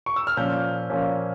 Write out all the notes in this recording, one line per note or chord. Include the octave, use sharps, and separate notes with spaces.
C#6
E6
F6
A#2 F3 A#3 C#4 G6
A#2 F3 A#3 C#4